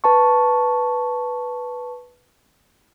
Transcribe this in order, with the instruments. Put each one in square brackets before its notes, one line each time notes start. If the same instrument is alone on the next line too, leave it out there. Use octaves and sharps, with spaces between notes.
[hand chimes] B4 A5 C#6